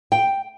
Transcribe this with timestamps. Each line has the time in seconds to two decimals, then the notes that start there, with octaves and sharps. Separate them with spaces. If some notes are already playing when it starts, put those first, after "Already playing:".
0.12 G5